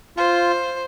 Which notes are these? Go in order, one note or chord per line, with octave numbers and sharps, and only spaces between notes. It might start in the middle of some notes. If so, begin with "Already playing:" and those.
F4 C5